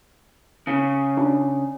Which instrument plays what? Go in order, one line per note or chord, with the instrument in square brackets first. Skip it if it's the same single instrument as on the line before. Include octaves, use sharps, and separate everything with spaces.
[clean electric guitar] C#3
[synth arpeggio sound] D4